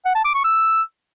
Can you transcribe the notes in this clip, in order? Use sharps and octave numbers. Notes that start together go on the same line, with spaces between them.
F#5
A5
D6
C#6
E6